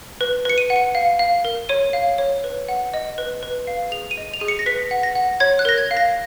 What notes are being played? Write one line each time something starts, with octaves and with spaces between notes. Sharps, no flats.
B4
B4 C#7
D#7
F#5
C#7
F5
F5
A#4
C#5 D#7
F5
C#5
B4
F#5
D#5
B4
B4
F5
G#4 F7
D#7
D#5
F7
G#4 D#7
C#7
A#6
B4 B6
F#5
A#6
F#5
C#5 G#6
F#6
A#4 A#6
G#6
F5
A#6